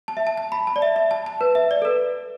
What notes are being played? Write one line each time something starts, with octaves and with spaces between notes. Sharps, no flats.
A5
E5
A5
A5
B5
A5
D5
E5
E5
A5
A5
B4
E5
D5
A4
B4